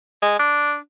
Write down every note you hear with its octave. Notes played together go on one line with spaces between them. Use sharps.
G#3
D4